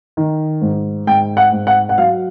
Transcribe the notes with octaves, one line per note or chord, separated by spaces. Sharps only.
D#3
G#2
G#2 G5
F#5
G#2
F#5
F#5
F#3 F5